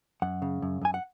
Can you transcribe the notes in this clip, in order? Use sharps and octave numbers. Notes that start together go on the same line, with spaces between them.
F#2 F#5
C#3
F#2
F#2 G#5
F#5